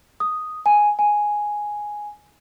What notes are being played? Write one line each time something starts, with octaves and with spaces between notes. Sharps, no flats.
D#6
G#5
G#5